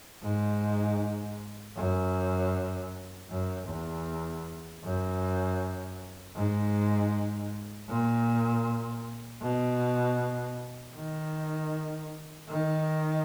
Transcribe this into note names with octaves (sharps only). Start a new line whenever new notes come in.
G#2
F#2
F#2
E2
F#2
G#2
A#2
B2
D#3
D#3